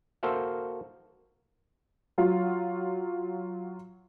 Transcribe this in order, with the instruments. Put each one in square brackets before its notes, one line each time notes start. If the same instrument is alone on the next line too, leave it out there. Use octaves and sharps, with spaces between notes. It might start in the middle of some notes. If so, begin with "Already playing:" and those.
[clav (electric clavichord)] A#3 F#4 A4 C5 E5 F5
[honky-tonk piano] F#3 F4